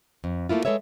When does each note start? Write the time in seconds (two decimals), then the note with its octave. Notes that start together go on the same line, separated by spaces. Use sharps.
0.24 F2
0.49 A3 A#3 E4 F4
0.65 G#3 A4 B4 C#5 E5